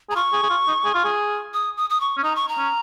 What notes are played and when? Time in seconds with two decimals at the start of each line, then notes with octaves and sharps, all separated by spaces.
0.10 G#4 A#5
0.16 F4 C#6
0.33 G#4
0.43 G#4
0.50 F4
0.67 D#4
0.85 G#4
0.94 F4
1.04 G#4
1.54 D#6
1.77 D#6
1.90 D#6
2.01 C#6
2.17 C#4
2.23 D#4 A#5
2.36 C#6
2.49 A#5
2.58 C#4